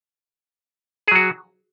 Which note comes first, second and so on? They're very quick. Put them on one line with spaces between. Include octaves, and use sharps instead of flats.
G#4 F#3 F#4